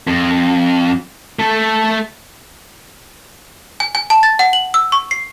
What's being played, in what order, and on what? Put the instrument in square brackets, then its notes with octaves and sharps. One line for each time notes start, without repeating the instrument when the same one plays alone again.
[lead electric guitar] F2
A3 A4
[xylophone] G#5
G#5
A5
A6
F#5
F#7
E6
C#6
C7